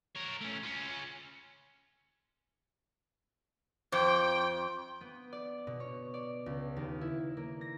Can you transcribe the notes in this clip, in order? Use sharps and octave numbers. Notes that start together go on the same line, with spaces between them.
A#4 C#5
A3 C#4
C#4 F4
F2 C5 G5 D6
B3
D5
B2
C#5
D5
C#2
D#2
E4
A#3
A#6